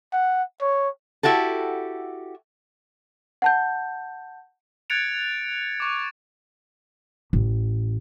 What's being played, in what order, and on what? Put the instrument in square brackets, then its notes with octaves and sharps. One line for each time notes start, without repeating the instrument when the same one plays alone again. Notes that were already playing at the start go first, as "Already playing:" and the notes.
[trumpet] F#5
C#5
[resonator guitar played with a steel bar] E4 F#4 G4 A4
[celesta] F#5 A5 G6
[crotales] F#6 G#6 A6 C#7 D7 F7
C#6 D6
[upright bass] A1